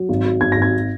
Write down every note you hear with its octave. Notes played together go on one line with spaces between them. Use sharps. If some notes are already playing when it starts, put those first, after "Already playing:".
Already playing: F#3
G#1
F#3
G#1 G#6
A#6
G#1 G#6